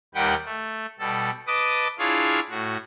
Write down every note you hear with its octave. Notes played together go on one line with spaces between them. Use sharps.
D#2 D#3 G3 B4 F#5 G5
A3
B2 G3 A4
B4 D#5 A5 D6 D#6
D4 E4 F4 G#4 C#5 F5
A2 F#4